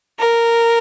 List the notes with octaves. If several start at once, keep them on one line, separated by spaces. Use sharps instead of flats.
A#4